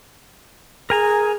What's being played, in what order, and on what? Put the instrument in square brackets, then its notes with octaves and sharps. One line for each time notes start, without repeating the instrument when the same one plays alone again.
[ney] G#4 [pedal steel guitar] A#4 G#5 A#5